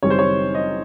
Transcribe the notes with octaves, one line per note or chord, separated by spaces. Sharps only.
F#1 F#2 D#3 G3 C4 C#5
C5
C#5
D#5